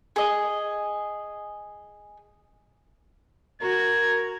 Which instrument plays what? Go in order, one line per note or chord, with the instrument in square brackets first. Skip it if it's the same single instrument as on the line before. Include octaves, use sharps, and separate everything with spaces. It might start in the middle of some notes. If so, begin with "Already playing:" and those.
[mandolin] G#4 D#5
[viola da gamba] F#4 [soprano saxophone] A#4 [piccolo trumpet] G#6